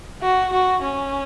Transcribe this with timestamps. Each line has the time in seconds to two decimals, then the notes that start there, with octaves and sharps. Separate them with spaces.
0.22 F#4
0.53 F#4
0.82 C#4